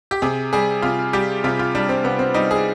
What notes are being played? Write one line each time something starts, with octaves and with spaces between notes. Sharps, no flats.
G4
C3 G#4
G3 G#4
C3 F4
G3 G4
C3 F4
F4
G3 D4
C4
C3 B3
C4
G3 D#4
G#4